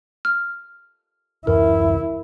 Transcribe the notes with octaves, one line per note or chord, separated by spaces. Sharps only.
F6
D1 F#2 E3 E4 A#4